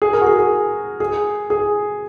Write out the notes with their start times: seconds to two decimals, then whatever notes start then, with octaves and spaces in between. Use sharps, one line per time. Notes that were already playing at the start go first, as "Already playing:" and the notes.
0.02 G#4
0.13 A#4
0.21 F#4
0.27 G#4
0.39 G#4
1.00 G#4
1.50 G#4